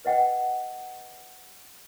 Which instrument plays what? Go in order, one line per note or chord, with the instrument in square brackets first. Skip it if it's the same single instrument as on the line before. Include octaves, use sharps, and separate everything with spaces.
[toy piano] B4 D#5 F#5 G5